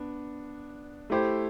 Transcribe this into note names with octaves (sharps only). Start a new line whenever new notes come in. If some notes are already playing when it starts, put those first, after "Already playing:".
Already playing: B3 D4
A3 E4 G4 C5